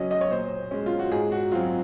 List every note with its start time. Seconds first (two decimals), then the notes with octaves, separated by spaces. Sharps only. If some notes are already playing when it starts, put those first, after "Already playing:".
Already playing: C#3 F#3 C#4 D#5
0.11 D#5
0.21 C#5
0.31 A#2 C5
0.71 G#3 C#4
0.86 F4
0.99 F#4
1.12 G#2 G#4
1.32 F#4
1.52 F#3 C4 F4